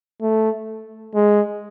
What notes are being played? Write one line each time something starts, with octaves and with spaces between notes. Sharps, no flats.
A3
G#3